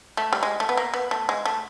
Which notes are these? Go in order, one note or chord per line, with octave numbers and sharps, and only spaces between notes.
A3
G3
G#3
A3
B3
A#3
B3
A3
G#3
A3